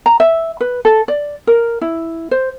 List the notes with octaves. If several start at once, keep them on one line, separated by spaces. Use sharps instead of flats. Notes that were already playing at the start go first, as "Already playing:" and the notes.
A#5
E5
B4
A4
D5
A#4
E4
C5